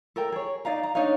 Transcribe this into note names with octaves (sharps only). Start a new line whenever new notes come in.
A4 A#4 G5
G#4 C#5
D#4 D5 F5 A#5
A#5
D4 D#4 C#5 F5